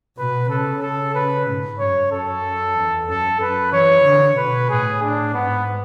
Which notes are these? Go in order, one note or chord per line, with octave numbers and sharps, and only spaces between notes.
B2 B4
C#3 A4
A4
B4
G#2
F#2 C#5
F#2 A4
E2
F#2 A4
F#2 B4
E3 C#5
D3
B2 B4
A2 G#4
D4
G#2 B3